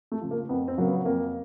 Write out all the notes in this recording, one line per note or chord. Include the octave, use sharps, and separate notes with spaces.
A3
C#3 F3
A#3
F2 B3
C4
C#3 F#3 A#3
B3
F2 A#3